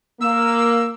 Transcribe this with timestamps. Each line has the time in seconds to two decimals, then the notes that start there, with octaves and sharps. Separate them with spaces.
0.21 A#3 E6